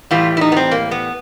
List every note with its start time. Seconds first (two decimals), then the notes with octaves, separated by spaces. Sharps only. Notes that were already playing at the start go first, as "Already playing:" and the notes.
0.11 A2 E3 G3 F4
0.37 E4
0.41 D#4
0.52 B3
0.57 C4
0.71 A#3
0.91 B3